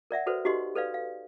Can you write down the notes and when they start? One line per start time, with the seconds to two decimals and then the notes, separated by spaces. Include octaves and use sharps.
0.11 A#4 D5 E5 F#5
0.26 F#4 A4 B4 C5 D5
0.45 D#4 F#4 G4 D#5 C6
0.75 A4 B4 D5 F5
0.94 F5